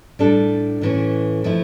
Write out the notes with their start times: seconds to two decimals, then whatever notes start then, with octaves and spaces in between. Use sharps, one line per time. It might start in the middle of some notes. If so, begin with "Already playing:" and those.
0.19 A2 G3 D4 A4
0.81 A2 E3 A3 C#4
1.44 F3 A3 E4